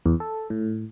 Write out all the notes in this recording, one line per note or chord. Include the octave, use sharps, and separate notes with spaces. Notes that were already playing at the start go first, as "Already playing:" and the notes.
E2
A4
A2